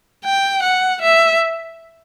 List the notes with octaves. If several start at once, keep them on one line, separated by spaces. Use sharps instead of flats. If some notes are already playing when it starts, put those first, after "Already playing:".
G5
F#5
E5